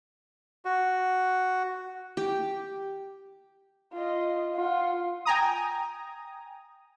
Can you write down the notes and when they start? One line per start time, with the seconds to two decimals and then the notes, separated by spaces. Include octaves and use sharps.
0.65 F#4
2.17 G4
3.93 F4 D#5
4.55 F4 F#5
5.25 G5 G#5 A#5 D#6